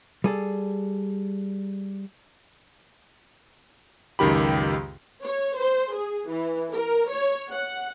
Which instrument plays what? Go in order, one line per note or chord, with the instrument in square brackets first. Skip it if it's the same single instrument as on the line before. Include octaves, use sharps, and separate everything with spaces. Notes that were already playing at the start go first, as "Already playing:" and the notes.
[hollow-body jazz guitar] G3 G#4 A4
[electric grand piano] C#2 F#2 D#3 G4 B5
[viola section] C#5
C5
G#4
E3
A#4
C#5
F#5